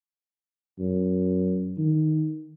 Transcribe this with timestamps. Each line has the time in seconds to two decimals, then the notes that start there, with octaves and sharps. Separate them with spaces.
0.79 F#2
1.78 D#3